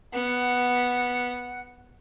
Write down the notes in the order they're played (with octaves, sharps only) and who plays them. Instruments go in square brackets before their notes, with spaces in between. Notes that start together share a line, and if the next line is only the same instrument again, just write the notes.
[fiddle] B3 [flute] F#5